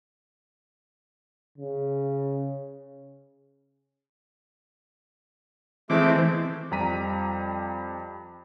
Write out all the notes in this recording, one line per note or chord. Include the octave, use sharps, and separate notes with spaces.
C#3
E3 G#3 A3 C4 D6
F2 G3 A#5 B6 D#7